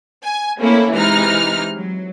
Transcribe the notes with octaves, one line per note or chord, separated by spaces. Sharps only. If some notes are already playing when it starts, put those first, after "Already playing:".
G#5
A3 A#3 C4 C#4 E4
C3 E3 G#3 D#4 F6
F#3